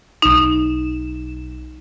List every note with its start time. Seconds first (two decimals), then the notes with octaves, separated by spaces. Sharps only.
0.22 B1 D#4 E7